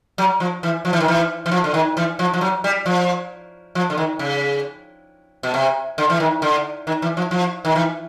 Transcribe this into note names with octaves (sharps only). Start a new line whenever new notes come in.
F#3
F3
E3
F3
E3
D#3
E3
E3
F3
D3
D#3
E3
F3
F3
F#3
G3
F3
F3
D3
D#3
C#3
B2
C3
D3
E3
D#3
D3
D#3
E3
F3
F3
D#3
E3